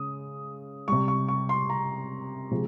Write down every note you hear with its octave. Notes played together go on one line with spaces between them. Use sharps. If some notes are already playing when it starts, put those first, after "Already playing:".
Already playing: C#3 G#3 D#6
C3 G3 C#6
C#6
C#6
C6
A#5
C3 F3 G#3